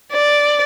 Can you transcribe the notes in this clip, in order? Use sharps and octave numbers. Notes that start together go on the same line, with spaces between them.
D5